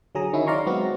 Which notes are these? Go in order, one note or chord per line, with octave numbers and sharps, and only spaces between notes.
D3 F#3 G#4 A#5 D#6
D#3 C#4 D#4 E4
D#4 D5 F5 A#5 C6 C#6
F#3 G#3 B3 C4 F#4